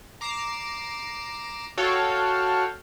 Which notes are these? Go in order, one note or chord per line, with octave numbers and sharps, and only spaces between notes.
A#5 D6 C7 E7
F#4 A4 C#5 F5 G5